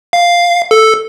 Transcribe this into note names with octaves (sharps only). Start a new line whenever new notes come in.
F5
A4